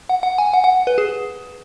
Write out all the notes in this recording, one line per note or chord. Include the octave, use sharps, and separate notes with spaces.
F#5
F#5
G#5
F#5
F#5
B4
G#4